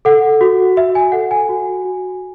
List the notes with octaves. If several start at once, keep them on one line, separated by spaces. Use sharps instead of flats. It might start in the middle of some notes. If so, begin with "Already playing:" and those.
A4 F#5
F#4
F#4 E5
G#5
A4 F#5
G#5
F#4
F#4